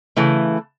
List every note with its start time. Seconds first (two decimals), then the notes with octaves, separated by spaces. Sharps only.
0.17 C#3 E3 A3